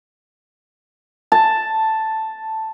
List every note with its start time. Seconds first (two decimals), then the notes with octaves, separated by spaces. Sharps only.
1.32 A5